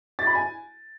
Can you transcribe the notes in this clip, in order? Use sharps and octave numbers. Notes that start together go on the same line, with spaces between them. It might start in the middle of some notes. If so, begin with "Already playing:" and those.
A6
B5
G#5